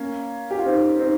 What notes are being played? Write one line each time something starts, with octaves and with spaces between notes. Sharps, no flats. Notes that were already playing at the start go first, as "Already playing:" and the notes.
Already playing: A#3 C#4
G4
F4
C4 D#4
C4 D#4